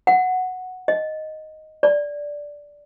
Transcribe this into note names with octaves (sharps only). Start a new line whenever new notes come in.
F#5
D#5
D5